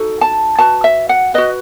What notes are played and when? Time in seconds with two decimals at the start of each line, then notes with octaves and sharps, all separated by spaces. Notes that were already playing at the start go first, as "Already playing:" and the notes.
Already playing: D#4 F#4 A4
0.21 A5
0.59 F#4 B4 A5
0.84 E5
1.09 F#5
1.34 F#4 B4 D#5